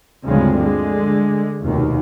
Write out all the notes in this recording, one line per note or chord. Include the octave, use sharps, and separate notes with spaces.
D2 G2 C#3 F3 G#3 C4
D3 G#3
F1 D#2 B2 D#3